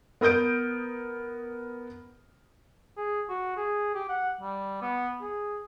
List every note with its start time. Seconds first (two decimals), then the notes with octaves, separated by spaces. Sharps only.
0.21 B3 A#4 D#6 G6 D7
2.97 G#4
3.29 F#4
3.57 G#4
3.94 G4
4.09 F#5
4.41 G3
4.82 B3
5.21 G#4